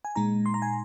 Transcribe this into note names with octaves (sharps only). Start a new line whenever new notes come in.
G#5
A#2 G#3 D#4 A#5
C6
A#5
G#5